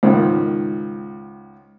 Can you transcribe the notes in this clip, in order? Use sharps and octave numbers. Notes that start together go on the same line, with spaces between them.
C#2 G#2 D#3